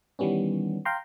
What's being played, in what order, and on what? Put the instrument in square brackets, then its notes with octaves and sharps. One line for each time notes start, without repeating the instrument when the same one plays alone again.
[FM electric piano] D#3 E3 G3 B3 C#4
F5 G5 A#5 C6